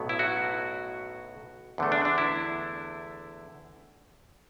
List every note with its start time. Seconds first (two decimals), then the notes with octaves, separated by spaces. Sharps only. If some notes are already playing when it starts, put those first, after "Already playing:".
Already playing: B1 A2 F#3 B3
0.09 E4
0.19 F#4
1.78 E2 D3 A3
1.92 D4
2.05 D4
2.18 E4